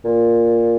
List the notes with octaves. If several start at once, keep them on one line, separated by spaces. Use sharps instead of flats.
A#2